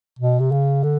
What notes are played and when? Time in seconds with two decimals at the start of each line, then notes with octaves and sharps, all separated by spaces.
0.19 B2
0.40 C3
0.51 C#3
0.83 D3